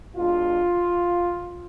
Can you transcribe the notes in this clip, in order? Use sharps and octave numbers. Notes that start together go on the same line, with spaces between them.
B2 G#3 D4 F4